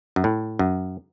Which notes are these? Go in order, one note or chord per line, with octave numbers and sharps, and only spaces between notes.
F#2
A2
F#2